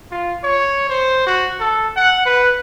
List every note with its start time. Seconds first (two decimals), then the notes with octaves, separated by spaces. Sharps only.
0.11 F4
0.44 C#5
0.89 C5
1.26 F#4
1.60 A4
1.96 F#5
2.25 B4